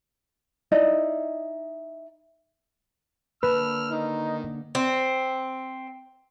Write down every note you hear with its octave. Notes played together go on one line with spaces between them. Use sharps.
D#4 E4 D5 D#5
D3 A#3 B4 A5 E6 F6
D#3 D#4
C4